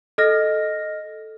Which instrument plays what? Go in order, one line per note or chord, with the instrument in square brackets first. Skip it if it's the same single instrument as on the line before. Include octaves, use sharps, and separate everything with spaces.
[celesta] A4 D#5 F6 A#6